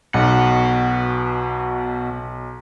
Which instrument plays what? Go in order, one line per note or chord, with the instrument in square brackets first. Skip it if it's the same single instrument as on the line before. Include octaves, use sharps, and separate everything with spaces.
[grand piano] B1 [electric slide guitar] B2 F#5